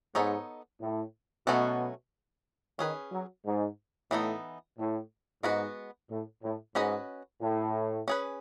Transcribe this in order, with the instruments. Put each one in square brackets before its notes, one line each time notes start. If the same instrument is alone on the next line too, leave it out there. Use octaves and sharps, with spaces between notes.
[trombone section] G#2 [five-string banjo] B3 D#4 A4 C#5
[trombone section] A2
[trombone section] B2 [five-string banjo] F#3 A3 C#4 F#4 A4
[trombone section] D#3 [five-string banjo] C#4 G#4 B4
[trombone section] F#3
G#2
[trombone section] A2 [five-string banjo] E3 B3 D#4 A4
[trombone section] A2
[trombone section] G#2 [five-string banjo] G#3 B3 F#4 B4
[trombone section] A2
A2
[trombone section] G#2 [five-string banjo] C#4 F#4 B4 D#5
[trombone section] A2
[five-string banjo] C#4 G#4 B4